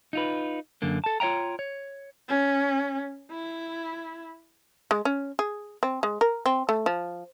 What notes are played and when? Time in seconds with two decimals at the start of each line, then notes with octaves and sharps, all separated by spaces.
0.13 D#4 F4 B4
0.82 F#2 D3 A#3
1.04 A4 A5
1.20 F4 C#5 E5 G5 A#5
1.59 C#5
2.29 C#4
3.32 E4
4.91 G#3
5.05 C#4
5.39 G#4
5.83 C4
6.03 G#3
6.21 A#4
6.46 C4
6.69 A3
6.86 F3